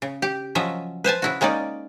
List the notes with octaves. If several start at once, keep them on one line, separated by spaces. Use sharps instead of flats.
C#3
G4
F3 F#3 C#4 D#5 E5
B4 C5 G#5 A5
C#3 E4 F#4
G#3 A#3 C#4 D#4 D5